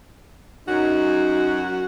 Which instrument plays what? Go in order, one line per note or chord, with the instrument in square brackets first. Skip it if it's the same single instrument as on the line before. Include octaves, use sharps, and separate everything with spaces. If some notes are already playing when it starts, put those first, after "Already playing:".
[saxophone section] F#2 F#4 [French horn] D#4